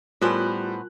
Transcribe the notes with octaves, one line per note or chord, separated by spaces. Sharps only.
A2 G3 B3 F4 A#4 C5 G#5 F#6